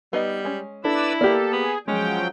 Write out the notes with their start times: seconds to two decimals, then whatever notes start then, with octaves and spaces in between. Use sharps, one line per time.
0.13 G3 B3 D#4 D#5
0.45 G#3 C#4
0.85 D4 E4 A4 B4 D5 E6
1.21 A#3 G4 A4 D5
1.52 B3 G#4
1.88 F3 F#3 G#3 C#4 G5